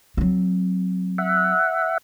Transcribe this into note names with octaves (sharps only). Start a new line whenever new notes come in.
F#3 C4
E5 F#5